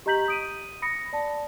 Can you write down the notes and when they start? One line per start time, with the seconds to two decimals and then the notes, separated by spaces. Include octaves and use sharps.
0.06 G4 D#5 A#5 G6 B6 F#7
0.28 D#6 D7 D#7
0.82 B5 D#6 A#6 C#7
1.13 D5 A5